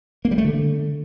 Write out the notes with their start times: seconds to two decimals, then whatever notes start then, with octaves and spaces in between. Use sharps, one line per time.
0.25 A#3
0.31 G3
0.38 A3
0.44 D3